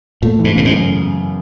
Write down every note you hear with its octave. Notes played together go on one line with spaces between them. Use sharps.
A#2 A3
E3
G#2
A2 C#3
G#2
F#2